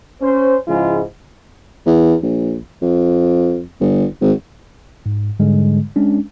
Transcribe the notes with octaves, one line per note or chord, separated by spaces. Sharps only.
C#4 C5
G#2 C#3 F3 G#3 E4 F4
E2
A#1
F2
G1
G#1
G#2
G#2 D3 G3 G#3
G#3 C#4 D4